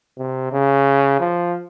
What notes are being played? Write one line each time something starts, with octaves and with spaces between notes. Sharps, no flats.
C3
C#3
F3